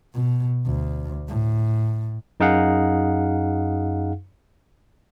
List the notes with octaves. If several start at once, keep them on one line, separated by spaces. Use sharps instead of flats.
B2
D2
A2
F#2 D#4 G#4 F5 F#5